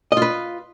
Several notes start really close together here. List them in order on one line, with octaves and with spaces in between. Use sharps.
D#5 F4 B4